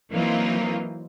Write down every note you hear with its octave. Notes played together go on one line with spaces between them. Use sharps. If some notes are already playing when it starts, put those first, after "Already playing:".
E3 F#3 A#3 C4 D#4 F4